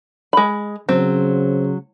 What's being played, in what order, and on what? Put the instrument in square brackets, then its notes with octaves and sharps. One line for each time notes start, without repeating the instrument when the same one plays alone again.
[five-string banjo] G#3 B5
[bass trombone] C#3 [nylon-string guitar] F#3 [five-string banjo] C4